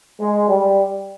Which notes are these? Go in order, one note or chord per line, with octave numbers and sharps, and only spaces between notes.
G#3
G3